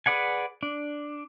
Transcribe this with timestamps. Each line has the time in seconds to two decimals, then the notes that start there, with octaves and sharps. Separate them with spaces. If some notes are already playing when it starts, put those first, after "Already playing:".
0.06 G#4 B4 D5 F#5 G#5
0.63 D4